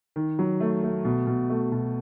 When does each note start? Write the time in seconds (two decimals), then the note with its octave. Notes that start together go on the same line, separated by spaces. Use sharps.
0.16 D#3
0.39 F#3
0.60 A3
0.83 A3
1.05 B2
1.27 B2
1.50 A3
1.72 B2